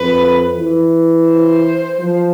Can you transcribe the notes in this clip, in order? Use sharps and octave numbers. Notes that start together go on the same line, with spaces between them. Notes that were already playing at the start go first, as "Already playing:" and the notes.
Already playing: F2 B4
E3
C5
F3